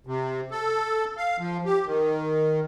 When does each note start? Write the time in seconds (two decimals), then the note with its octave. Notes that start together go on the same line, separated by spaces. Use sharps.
0.07 C3
0.51 A4
1.17 F5
1.39 F3
1.65 G4
1.86 D#3